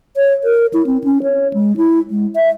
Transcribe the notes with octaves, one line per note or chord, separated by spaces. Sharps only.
C#5
A#4
E4
C4
C#4
C#5
G#3
E4
G#3
E5